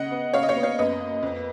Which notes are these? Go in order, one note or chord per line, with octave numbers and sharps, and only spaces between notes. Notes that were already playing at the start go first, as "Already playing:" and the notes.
Already playing: C#3 D#5 F#5
B3
C#3 C#5 F5
D#5
C#5 F5
B3
C#5 F5
F#2 B4 D#5
A#3
F2